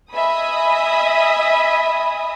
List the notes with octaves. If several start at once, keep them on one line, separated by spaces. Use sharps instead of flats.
D#5 E5 G#5 B5 D#6